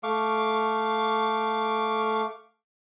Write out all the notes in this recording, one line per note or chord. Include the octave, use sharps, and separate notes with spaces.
A3 F5 C#6 D6